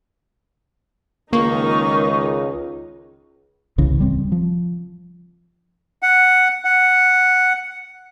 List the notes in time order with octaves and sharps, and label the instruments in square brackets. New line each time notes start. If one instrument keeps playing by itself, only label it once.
[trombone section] C#2 [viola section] D#3 D#4 [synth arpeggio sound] A#3 [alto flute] C#6
[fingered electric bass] F1 C2 C#3 E3
D1 C#3 G3 C4
F3
[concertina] F#5
F#5